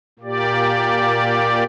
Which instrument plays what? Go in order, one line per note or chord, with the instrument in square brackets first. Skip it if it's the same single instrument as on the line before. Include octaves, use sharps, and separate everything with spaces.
[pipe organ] A#2 A#3 G4 D5